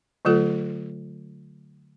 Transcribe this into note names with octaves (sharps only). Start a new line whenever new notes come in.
D3 F#3 A3 F4 A4